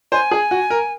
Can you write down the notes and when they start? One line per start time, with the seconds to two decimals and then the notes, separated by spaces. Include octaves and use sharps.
0.12 C5 G#5
0.31 G#4
0.51 F#4
0.70 A#4